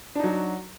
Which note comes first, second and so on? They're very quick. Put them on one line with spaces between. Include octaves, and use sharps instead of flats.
D4 D#4 F#3 F#4